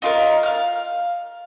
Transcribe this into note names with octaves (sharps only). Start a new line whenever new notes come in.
D#4 F4 A#4
F5 F6